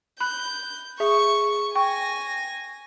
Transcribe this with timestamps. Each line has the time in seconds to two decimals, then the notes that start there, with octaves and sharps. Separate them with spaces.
0.20 B5 F#6 G6
1.00 G#4 E5 C#6 C#7
1.75 G5 G#5 C#6 A#6